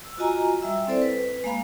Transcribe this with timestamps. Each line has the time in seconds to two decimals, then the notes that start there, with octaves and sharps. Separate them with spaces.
0.05 E6
0.18 F4 F#4 D#5 G#5 A#5
0.61 G3 E5 E6
0.87 C4 E4 A4 C5 D5
1.02 B4
1.44 G#3 A#3 F5 B5